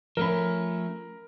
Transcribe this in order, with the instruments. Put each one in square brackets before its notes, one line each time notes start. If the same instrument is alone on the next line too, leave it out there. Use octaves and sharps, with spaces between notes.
[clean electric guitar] F3 A3 C#4 [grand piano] A#4 B5